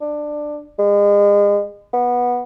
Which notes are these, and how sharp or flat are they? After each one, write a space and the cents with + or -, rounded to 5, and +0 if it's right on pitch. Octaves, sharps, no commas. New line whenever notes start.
D4 +15
G#3 -35
B3 -15